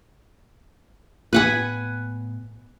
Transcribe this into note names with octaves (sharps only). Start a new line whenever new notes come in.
A2 B3 B4 F#5 G#5